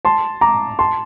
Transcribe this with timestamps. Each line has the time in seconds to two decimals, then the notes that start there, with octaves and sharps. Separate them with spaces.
0.05 A5 C6
0.41 A#5 D6
0.79 A5 C6